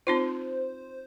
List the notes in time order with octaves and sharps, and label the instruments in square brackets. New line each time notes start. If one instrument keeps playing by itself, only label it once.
[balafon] C4 D#4 F4 [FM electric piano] C5